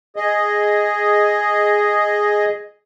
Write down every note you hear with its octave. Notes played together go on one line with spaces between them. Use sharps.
G#4 D#5